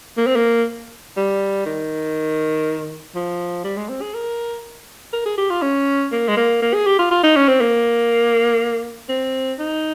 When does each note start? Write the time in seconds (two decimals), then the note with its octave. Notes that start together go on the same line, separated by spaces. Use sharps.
0.17 A#3
0.27 C4
0.36 A#3
1.17 G3
1.66 D#3
3.15 F3
3.64 G3
3.77 G#3
3.89 C4
4.01 G#4
4.14 A#4
5.13 A#4
5.26 G#4
5.37 G4
5.50 F4
5.62 C#4
6.12 A#3
6.28 G#3
6.37 A#3
6.62 A#3
6.74 G#4
6.87 G4
6.99 F4
7.11 F4
7.23 D#4
7.36 C#4
7.48 C4
7.61 A#3
9.09 C4
9.59 D#4